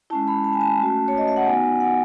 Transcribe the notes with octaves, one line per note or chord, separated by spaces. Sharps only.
G#3 C#4 E4 A5
B5
A5
G#5
A5
A3 C#4 F#4
C#5
D#5
E5
F#5
B3 D#4 F#4 G#5
F#5